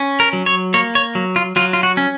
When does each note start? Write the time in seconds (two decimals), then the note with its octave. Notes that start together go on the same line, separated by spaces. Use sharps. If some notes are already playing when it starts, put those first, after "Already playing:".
Already playing: C#4
0.20 A#4
0.33 F#3
0.46 C#5
0.74 A#3 C#5
0.95 C#5
1.15 F#3
1.36 F4
1.56 F#3 F4
1.73 F4
1.83 F#4
1.97 C#4